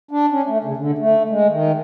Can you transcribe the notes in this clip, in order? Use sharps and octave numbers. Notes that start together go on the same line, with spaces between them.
D4
C#4
A3
C#3
D3
A3
G#3
D#3